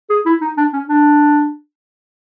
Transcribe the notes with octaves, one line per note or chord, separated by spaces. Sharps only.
G#4
E4
D#4
D4
C#4
D4